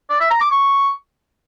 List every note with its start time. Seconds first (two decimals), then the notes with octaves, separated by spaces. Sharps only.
0.10 D5
0.20 E5
0.31 A#5
0.41 D6
0.51 C#6